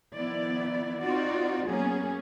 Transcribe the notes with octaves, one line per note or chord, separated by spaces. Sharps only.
D#3 F3 B3 E4 D5
C4 D#4 F4 F#4 D5
F#3 A#3 B3 C#4 G#4